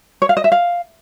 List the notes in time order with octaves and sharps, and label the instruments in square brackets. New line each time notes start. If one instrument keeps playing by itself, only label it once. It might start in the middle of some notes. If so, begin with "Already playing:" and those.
[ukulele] C#5
F5
D#5
E5
F5